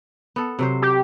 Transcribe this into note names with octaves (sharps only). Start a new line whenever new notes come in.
B3 A4
C3 F#3 C5
G4